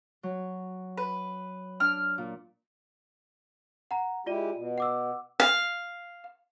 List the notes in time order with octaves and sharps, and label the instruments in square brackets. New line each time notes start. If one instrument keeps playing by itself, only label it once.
[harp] F#3
[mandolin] B4
[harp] D4 [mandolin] F6
[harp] A#2
[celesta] F#5 A#5
[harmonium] G#3 E4 G4 [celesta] F4 D5 D#7
[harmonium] B2
[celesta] F#5 D6 E6
[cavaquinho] F5